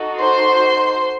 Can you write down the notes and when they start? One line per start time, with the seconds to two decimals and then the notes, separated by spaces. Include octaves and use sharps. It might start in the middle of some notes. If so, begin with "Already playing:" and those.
Already playing: D#4 F#4 A4
0.19 C5 C6